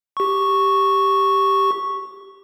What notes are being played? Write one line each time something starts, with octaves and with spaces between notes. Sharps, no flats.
G4 C#6